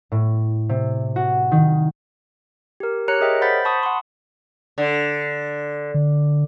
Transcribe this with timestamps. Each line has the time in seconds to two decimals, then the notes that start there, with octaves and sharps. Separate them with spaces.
0.12 A2
0.69 C3
1.16 F#4
1.52 D#3
2.80 G4 A#4
3.08 G4 C#5 A#5 F#6 C#7
3.21 G#4 A#4 C#5 D#5 E5 G5
3.41 C5 F#5 B5 G6 A6 B6
3.65 A5 B5 C#6 D#6
3.83 F#5 C6
4.78 D3
5.94 D3